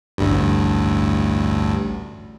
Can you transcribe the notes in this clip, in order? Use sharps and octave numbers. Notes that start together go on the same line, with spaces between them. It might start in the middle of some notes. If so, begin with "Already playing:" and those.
A1 D2 G2